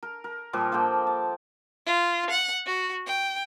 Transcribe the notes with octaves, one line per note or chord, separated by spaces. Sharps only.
A#4
A#4
A#2 F3 G3
F3 A#3 A4 G5
A5
F4
F#5
F#4
G5